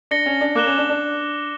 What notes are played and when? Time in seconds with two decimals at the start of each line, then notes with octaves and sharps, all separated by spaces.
0.11 D4 A#6 C#7 G7
0.26 C#4
0.41 D4
0.55 A#3 D6 F#6 A#6 E7 G7
0.66 C#4
0.78 D4
0.89 D4